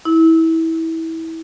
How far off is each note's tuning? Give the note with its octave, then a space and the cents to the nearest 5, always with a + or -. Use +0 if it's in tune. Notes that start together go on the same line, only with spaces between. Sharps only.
E4 -25